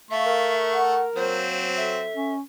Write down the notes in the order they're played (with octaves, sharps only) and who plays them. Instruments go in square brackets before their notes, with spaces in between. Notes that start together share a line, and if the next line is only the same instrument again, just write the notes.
[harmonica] A3 C#6 [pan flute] E5 [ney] F5
[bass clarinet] A#4
[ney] F#5
[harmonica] F#3 C4 [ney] A#3 [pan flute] C5
[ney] A4 [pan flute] E5
[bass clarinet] C#4